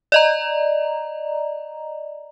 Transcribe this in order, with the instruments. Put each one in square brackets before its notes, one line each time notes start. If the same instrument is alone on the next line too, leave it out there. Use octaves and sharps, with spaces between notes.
[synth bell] D5 D#5 A#5